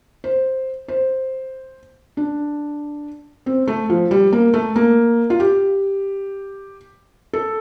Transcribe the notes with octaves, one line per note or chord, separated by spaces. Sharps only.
C5
C5
D4
C4
A3
F3
G3
A#3
A3
A#3
F4
G4
A4